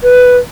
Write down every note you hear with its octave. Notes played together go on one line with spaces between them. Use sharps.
B4